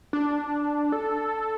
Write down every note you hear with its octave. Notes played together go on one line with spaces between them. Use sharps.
D4
A4